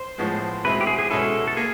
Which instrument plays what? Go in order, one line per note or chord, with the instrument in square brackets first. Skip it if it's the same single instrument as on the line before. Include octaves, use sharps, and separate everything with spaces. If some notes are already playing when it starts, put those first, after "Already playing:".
Already playing: [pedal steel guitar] C5
[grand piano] A2 F3 G#3 B3
[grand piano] B2 G#3 C4 E4 [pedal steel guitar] B4
[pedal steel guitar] G4
G#4
G#4
[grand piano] B2 G#3 C#4 E4 [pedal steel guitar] A4
[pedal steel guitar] A4
[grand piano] A#3 [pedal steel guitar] G#4